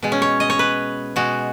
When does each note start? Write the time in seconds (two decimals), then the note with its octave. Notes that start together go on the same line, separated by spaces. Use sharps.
0.03 B2 G#3
0.12 C#4
0.22 C#5
0.40 D#5
0.50 C#5
0.59 B4
1.16 B2 G#3 F#4